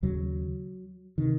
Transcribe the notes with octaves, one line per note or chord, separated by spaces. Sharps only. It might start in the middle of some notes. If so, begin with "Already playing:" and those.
D#2 C#3 F#3
C3 D#3